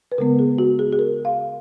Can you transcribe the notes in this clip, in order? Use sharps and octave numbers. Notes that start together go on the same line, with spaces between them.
B4
C#3 G#3 B3 A#4
G#4
F#4
G#4
G#4
A#4
F5